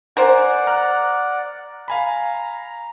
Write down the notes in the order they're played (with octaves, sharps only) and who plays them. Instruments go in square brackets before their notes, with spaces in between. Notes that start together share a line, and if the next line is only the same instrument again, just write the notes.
[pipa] A#4 C5 [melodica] D5 F#5 [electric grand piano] G#5
[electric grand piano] A#5 F6 F#6
[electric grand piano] F5 G#5 B5 [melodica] A#5